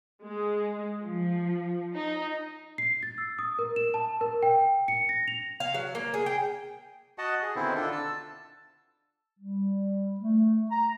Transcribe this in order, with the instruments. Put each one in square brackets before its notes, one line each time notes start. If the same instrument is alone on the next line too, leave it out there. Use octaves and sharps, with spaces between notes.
[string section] G#3
F3
D#4
[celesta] C7
A6
E6
D#6
A#4
E7
A5
A#4
G5
C#7
A#6
F7
[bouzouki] F5
F#3
A#3
G#4
G5
[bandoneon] F#4 D#5 F#5 A5
G#4
B2 D3 D#3 C4 E4
D3 D4 F4 A4
A5 E6
[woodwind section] G3
A3
A#5